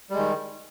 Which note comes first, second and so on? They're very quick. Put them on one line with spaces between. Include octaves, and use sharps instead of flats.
G3 G#3 D#3